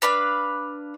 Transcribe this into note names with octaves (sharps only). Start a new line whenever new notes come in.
D4 B4 F5 B5